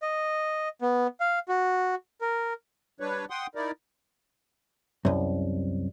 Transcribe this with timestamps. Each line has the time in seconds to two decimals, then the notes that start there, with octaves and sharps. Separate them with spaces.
0.02 D#5
0.81 B3
1.20 F5
1.49 F#4
2.21 A#4
3.00 G3 D4 B4 C#5
3.30 F#5 G5 C6 D#6
3.55 D#4 E4 A#4 D5
5.05 C2 F#2